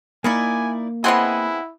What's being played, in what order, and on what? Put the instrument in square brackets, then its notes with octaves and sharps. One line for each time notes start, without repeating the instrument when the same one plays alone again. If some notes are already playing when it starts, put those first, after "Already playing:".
[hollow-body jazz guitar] A#3 [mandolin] D#4 E4 D5 [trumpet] G#5
[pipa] B3 C4 G#4 [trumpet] E4 [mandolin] D#5 F#5 F#6